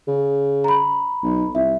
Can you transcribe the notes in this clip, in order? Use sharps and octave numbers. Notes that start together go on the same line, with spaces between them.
C#3
A#5 B5
B1
C2 E5